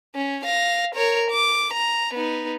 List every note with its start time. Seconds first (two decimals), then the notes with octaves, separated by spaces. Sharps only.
0.15 C#4
0.46 F5 A#6
0.95 A#4 C#5
1.31 D6
1.74 A#5
2.14 B3 D#4